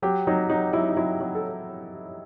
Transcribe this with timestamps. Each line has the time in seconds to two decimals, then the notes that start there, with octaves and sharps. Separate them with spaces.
0.02 F#3 G4
0.27 F#3 D#4
0.49 F#3 D#4
0.73 F#3 E4
0.89 D#4
0.97 F#3 E4
1.20 F#3
1.35 A4